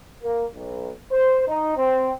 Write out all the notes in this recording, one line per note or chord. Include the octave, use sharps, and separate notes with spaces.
A#3
B1
C5
D#4
C4